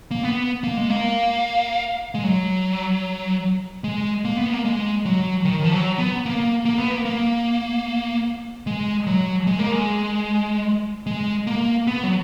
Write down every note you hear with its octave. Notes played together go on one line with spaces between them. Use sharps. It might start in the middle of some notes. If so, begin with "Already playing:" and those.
A#3
B3
A#3
G#3
A#3
G#3
F#3
G#3
A#3
B3
A#3
G#3
F#3
D#3
F3
F#3
B3
A#3
A#3
B3
A#3
A#3
G#3
F#3
G#3
A#3
G#3
G#3
A#3
B3
F#3